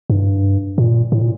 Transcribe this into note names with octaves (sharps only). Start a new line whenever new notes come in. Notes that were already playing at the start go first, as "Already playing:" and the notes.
G2
A#2
A2
A#2